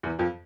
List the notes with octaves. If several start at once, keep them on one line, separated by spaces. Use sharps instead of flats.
E2 E3
F2 F3